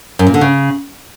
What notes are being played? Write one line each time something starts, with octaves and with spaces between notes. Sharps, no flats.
F#2
A#2
D3
C#3